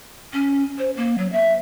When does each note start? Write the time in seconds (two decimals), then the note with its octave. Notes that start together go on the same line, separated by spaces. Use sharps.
0.33 C#4
0.78 C5
0.97 A#3
1.18 F#3
1.33 E5